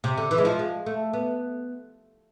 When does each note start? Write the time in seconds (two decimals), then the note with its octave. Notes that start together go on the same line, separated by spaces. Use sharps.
0.04 C3
0.17 D3
0.31 E3
0.38 G#3
0.45 F3
0.59 G#3
0.86 A3
1.13 B3